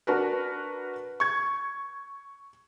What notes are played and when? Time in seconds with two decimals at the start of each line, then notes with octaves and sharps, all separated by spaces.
0.07 D4 F#4 A#4 B4
1.20 C#6 G#6